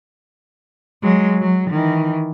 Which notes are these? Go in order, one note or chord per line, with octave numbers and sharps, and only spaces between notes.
F#3 G#3
F#3
D#3 E3